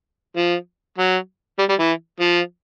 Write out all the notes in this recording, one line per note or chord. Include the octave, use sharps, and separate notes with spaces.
F3
F#3
G3
G3
E3
F3